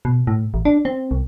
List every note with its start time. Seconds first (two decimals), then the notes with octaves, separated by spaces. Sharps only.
0.05 B2
0.27 A2
0.54 A1
0.65 D4
0.85 C4
1.11 C2